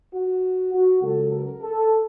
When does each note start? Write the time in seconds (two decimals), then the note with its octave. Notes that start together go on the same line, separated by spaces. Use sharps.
0.12 F#4
0.72 F#4
1.01 C#2 C#3 F#3 A4
1.32 A#4
1.61 A4